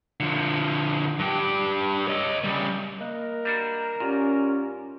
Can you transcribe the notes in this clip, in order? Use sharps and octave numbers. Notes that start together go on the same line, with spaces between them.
D3 F3
G2 G4
C#5 D#5
C#3 G3
A#3 A#4 D#5 F#6
G3 D4 F#4
G#2 C#4 F4 G4 D5